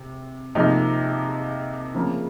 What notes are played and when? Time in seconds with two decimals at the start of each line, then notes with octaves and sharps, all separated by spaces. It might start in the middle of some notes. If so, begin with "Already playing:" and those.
Already playing: C3
0.55 C3 F3 A#3 D#4
1.94 C#3 F3 A#3